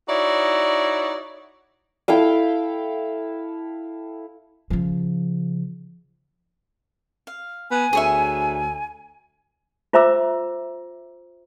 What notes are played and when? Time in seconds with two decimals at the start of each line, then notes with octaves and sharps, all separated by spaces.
0.08 D#4 E4 F#4 C#5 D5
2.08 E4 A4 F5 G5
4.70 C#3 F3
7.27 F5
7.71 B3 G#5
7.93 D2 G#4 C#5 E5
9.93 F4 C5 E5 A#5 D6 E6